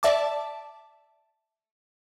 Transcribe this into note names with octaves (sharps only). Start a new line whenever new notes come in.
D5 E5 A5 D6